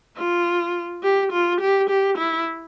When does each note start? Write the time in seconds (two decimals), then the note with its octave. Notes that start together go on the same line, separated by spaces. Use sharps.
0.17 F4
1.03 G4
1.32 F4
1.61 G4
1.90 G4
2.18 E4